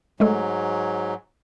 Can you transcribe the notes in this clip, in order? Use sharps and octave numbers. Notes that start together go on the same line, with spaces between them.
G#2 F#3 G#3 A3 A4